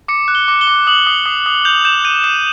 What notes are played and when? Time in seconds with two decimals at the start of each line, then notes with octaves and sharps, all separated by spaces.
0.08 D6 C#7
0.28 F#6
0.35 G7
0.48 D6
0.61 G7
0.67 D6
0.87 D#6 F#7
1.07 D#6
1.26 D#6
1.46 D#6
1.65 G6 F7
1.85 G6 E7
2.05 G6 D#7
2.24 D#6 E7